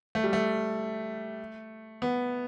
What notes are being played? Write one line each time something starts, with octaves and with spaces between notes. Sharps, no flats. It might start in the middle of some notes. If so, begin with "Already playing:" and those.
A3
G3
A3
B3